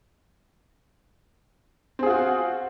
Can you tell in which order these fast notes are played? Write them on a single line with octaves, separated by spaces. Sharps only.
C4 G#4 F4 F#4